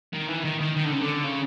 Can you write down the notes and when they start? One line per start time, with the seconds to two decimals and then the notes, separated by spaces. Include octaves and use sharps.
0.14 D#3
0.28 E3
0.45 D#3
0.60 D#3
0.77 D#3
0.85 D3
0.92 C#3
1.01 D3
1.24 C#3